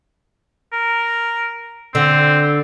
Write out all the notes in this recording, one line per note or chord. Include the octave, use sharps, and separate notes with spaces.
A#4
D3 C4